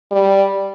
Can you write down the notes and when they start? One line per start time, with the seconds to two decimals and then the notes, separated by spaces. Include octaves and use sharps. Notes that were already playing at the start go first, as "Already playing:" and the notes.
0.11 G3